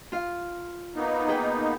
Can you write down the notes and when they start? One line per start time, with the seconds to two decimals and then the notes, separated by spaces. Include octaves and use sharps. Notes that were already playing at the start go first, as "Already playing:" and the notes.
0.12 F4 F5
0.96 A#3 B3 D#4
1.28 G#4 B4 G5